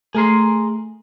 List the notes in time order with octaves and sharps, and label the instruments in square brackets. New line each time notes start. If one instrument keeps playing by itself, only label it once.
[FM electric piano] A3 [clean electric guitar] G#4 A#4 C6